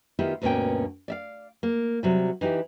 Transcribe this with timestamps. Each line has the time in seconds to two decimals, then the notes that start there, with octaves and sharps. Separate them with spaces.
0.19 D#3 B3 E4 F4 G4
0.42 D2 G2 B2 A#3 C#4 G5
1.08 D5 E5 F5
1.63 A#3
2.03 C3 F#3 G3
2.41 E3 D#4 E4 G4